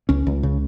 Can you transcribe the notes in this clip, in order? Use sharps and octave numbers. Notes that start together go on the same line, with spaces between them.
C#2 C#4
C#2
C#3